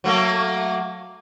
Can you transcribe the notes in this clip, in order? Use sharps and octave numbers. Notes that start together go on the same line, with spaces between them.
F#3 A3 A#3